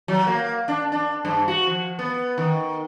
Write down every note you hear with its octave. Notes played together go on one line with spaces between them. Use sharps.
F#3
A#3
D4
D4
G2
F#4
F3
B3
D#3